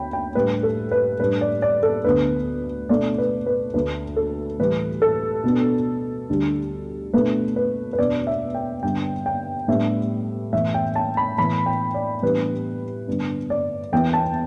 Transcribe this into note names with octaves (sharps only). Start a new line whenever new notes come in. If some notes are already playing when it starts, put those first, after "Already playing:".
Already playing: D2 D3 B3 D4 G5 B5
G5
A2 G3 D4 B4
A4
B4
A2 G3 D4 B4
D5
D5
A4
D2 D3 B3 D4 B4
B2 A3 D4 D5
B4
B4
D2 D3 A3 D4 B4
A4
A2 E3 G3 B4
A4
B2 B3 D4
D2 D3 G3 D4
B2 A3 D4 B4
B4
B4
E2 B2 B3 D4 D5
E5
G5
G2 D3 B3 D4 G5
G5
A2 G3 B3 D4 E5
A2 E3 B3 E5
G5
A5
B5
A2 E3 B3 B5
G5
D5
A2 E3 G3 B3 D4 B4
G2 D3 B3 D4
D5
E2 E3 B3 G5
A5